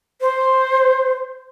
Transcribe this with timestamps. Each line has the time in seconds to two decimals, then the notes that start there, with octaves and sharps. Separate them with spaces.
0.21 C5